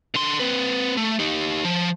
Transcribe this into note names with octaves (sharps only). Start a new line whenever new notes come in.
D3 C6
C4 B4
A3
D#4 G4
F3